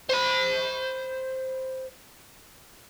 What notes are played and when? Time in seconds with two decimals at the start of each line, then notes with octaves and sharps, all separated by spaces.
0.10 C5 B5